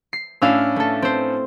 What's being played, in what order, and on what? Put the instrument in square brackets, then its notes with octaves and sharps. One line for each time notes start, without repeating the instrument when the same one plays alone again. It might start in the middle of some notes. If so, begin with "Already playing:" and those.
[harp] C7
[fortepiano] A2 C#4 D4 [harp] E4 F5 E6
[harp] A3 A4
C4 C5